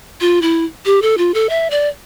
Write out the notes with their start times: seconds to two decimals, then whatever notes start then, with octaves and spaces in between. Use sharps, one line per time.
0.21 F4
0.42 E4
0.86 G4
1.02 A4
1.18 F4
1.34 A4
1.49 E5
1.71 D5